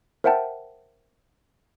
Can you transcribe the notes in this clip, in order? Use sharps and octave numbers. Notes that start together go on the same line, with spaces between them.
A#4 C5 E5 F#5 G5 A5